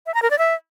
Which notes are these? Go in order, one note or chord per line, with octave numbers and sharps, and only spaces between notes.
E5
A#5
A#4
D5
E5